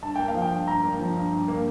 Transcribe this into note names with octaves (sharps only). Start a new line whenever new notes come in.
G2 A5
A#3 G5
F5
F3
G5
G2
G2 A#5
A#3
F3
G2
G2
A#3